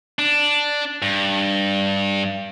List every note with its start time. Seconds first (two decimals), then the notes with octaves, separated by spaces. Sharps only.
0.19 D4
1.02 G2